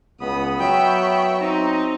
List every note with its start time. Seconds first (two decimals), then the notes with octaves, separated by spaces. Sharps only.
0.21 C#2 B3 B5 D#6
0.59 F#3 E5 G5 C#6
1.40 C4 D#4 A#5